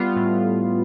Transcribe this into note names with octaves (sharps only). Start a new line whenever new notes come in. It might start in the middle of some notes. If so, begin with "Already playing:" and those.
Already playing: G3 B3 F4
A2